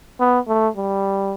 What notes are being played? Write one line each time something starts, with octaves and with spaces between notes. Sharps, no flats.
B3
A3
G3